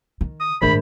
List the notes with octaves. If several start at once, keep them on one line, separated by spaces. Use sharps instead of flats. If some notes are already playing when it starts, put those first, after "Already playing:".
D#3
D#6
A1 G#2 D#3 D4 A#4 B5